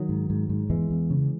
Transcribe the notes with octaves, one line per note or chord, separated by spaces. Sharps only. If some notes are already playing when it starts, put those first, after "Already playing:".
Already playing: D#3 F#3
G#2
G#2
G#2
E2 E3 G#3
E2
C#3